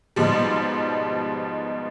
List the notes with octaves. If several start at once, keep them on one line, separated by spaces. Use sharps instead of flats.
G#2 B2 F3 G3